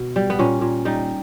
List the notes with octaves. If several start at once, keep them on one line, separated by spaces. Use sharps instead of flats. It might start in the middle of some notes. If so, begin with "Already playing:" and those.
Already playing: B2 B3
G3
B3
A#2 C#4
A#2
G3 D#4